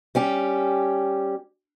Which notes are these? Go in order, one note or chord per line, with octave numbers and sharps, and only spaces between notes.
G3 C#4 G4